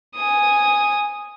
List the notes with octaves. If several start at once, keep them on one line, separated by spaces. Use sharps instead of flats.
G#5 D#6